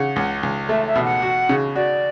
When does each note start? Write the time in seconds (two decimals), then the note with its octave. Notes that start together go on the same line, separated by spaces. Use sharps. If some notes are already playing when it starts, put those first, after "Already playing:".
Already playing: C#3 F#5
0.16 C#2
0.43 C#2
0.69 A3 E5
0.87 E5
0.95 B2
1.05 F#5
1.22 F#4
1.49 C#3
1.75 F#4 D5